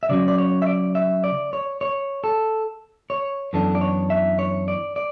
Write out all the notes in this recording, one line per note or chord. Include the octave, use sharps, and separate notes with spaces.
E5
C#3 F#3 C#4 D5
D5
C#5
E5
D5
E5
D5
C#5
C#5
A4
C#5
F#2 E3 B3 D4 A4
D5
C#5
E5
C#5
D5
D5